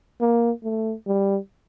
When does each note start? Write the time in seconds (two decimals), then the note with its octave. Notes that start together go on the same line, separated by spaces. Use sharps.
0.21 A#3
0.64 A3
1.07 G3